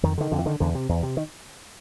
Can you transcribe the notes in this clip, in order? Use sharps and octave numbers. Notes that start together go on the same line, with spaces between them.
F2 D#3
D3 D#3
F2 D3
E3
D3 D#3
E2 D3
C3
E2
C3
D#3